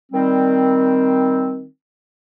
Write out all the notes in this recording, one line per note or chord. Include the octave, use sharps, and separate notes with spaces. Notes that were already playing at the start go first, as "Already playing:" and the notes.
D#3 G3 C4